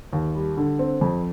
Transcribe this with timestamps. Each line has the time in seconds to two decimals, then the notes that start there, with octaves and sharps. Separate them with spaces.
0.13 D#2
0.35 G3
0.57 D3
0.79 C4
1.01 F2